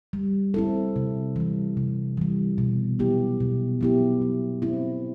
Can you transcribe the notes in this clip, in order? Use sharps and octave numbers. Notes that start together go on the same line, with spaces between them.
G3
C4 E4 A4
C3
E3 G3
C3
E3 G3
B2
F#3 B3 E4 G4
B2
F#3 B3 E4 G4
F#3
C4 E4